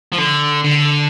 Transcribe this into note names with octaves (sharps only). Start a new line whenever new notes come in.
F3
D3
D3